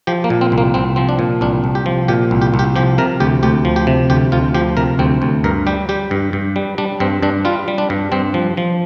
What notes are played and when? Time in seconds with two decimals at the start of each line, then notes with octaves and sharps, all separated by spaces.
0.07 F3 G4
0.24 A#3
0.30 A#2
0.41 C4
0.52 C2
0.58 A#3
0.74 C2 C4
0.96 F3 C4
1.09 D4
1.19 A#2
1.41 C2 D4
1.64 C2
1.75 G4
1.86 F3
2.08 A#2 G4
2.31 C2
2.42 G4
2.54 C2
2.59 G4
2.76 F3 G4
2.98 C3 A#4
3.20 D2 G4
3.43 D2 G4
3.65 F3
3.76 G4
3.87 C3
4.10 D2 G4
4.32 D2 F4
4.54 F3 G4
4.77 C3 A#4
4.99 D2 C4
5.22 D2
5.44 G2 A#4
5.67 G3 G4
5.89 G3 G4
6.11 G2
6.33 G2
6.56 G3
6.78 G3 D4
7.00 G2 C4
7.23 G2 D4
7.45 G3 F4
7.68 G3
7.78 D4
7.90 G2
8.12 G2 C4
8.34 F3
8.57 F3